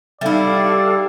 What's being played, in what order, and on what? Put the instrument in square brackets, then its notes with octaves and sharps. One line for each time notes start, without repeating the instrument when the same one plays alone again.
[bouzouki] G3 E4 [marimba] D#4 E5 [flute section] A4 F5 G5 [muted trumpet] D5